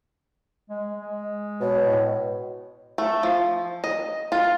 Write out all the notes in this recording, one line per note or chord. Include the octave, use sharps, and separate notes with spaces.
G#3
G#3
B2 C#5
A2
A3
F3
D#5
F4